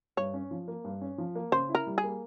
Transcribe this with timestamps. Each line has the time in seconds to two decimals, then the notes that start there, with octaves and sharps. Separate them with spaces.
0.17 G2 C#5
0.34 C#4
0.51 F3
0.68 A#3
0.85 G2
1.01 C#4
1.18 F3
1.35 A#3
1.52 C#3 C5
1.69 E4
1.75 A#4
1.87 G3
1.98 G#4
2.04 A#3